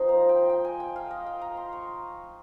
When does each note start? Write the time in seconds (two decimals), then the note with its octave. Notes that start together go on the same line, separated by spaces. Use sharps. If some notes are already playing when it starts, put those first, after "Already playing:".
Already playing: F3 C4 D#4 C6
0.09 A#5
0.29 G5
0.50 G5
0.65 G#5
0.80 G5
0.96 F5
1.11 D#5
1.26 G5
1.42 A#5
1.57 C6
1.73 C#6